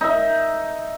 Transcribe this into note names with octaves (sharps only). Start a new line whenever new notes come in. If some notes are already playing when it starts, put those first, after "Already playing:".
D#4 E5